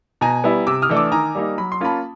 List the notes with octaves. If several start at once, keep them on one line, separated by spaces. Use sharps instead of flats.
B2 G#5 A#5
G3 B3 E4
C3 D6 E6
D#6 F6
E3 A3 D4
D6 E6
D#3 G#5 A#5
G3 A#3 D#4
F#3 B5
C6
A#3 C#4 F4 A5 B5